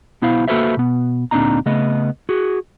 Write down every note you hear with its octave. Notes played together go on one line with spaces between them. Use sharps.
B1 B3 E4 C5 F5
A#3 F#4 A4 B4 C5 E5
B2 B3
D2 A#2 C4 D4 D#4 A#5
C#3 A3 B3 D#5
F#4 G#4